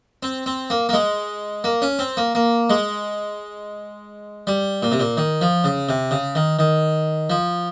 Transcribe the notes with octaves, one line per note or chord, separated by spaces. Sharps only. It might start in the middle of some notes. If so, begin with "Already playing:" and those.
C4
C4
A#3
A#3
G#3
A#3
C#4
C4
A#3
A#3
G#3
G3
A#2
C3
A#2
D#3
F3
C#3
C3
C#3
D#3
D#3
F3